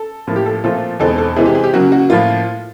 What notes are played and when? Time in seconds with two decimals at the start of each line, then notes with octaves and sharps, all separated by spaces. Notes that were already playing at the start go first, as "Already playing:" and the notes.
Already playing: A4
0.27 A2 F3 A#3
0.36 G4
0.46 A4
0.64 A#2 F3 A3 C4 F4 A4
1.00 E2 B2 G#3 C4 D#4 A4
1.18 A4
1.36 C3 E3 G#3 C4 E4 G#4
1.46 G4
1.55 G#4
1.64 G4
1.73 C#3 F#3 A#3 F#4
1.92 F#4
2.09 A2 F3 A#3 F4